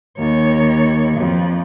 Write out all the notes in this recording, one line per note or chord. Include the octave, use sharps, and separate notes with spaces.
D#2 C#5
F2